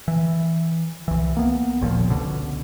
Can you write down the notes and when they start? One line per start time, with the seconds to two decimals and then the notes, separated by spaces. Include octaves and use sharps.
0.08 E3
1.08 C2 E3
1.37 A#3 B3
1.81 G#1 D#2 A#2 F3
2.10 C#2 B2 D3